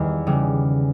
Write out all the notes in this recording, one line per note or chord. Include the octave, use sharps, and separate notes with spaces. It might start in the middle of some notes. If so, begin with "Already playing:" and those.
Already playing: E2 D#3 G3 B3 E4
C#3 E3 G3